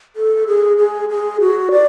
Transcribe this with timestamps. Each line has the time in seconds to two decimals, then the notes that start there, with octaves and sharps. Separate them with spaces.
0.16 A4
0.47 G#4
0.78 G#4
1.09 G#4
1.41 F#4
1.72 D5